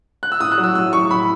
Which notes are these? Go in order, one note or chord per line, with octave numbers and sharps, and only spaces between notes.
F#6
E6
A2 D#6
F#6
F#3
E6
A2 E6
F#3 C#6
A2 B5